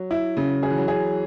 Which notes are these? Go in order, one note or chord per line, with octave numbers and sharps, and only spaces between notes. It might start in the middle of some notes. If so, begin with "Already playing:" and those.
Already playing: F#3
E4
C#3
F#3 G#4
E3
F#3
G#4